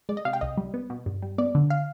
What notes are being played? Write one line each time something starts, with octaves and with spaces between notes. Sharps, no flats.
G#3 D5
D#5
C3 F5
G5
C2 D#5
G3
B3
B2
G2
G3
B3 D5
D3
F5